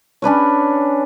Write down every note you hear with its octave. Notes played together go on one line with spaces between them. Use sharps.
C#4 D4 B4 C#5